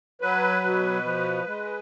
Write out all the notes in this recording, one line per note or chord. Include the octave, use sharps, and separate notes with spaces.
F#3 B4
B2
F3
G#3